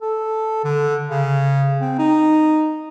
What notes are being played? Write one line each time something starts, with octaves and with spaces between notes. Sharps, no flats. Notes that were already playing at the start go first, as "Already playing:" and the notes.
A4
D3
C#3
C4
D#4